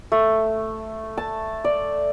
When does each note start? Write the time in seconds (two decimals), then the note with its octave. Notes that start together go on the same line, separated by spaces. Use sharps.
0.12 A3
1.17 A5
1.64 D5